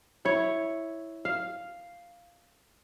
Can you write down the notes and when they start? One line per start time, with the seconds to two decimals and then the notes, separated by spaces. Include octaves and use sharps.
0.25 E4 C#5
1.25 F5